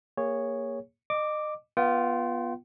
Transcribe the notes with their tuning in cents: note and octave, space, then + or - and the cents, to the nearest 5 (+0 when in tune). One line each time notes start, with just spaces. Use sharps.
A#3 +0 G#4 -30 C#5 +0
D#5 -30 D6 +0
B3 -15 F4 +0 G5 -40